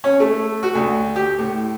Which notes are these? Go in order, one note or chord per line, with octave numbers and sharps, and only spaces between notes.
C#4
A3
F#4
D2
G4
A2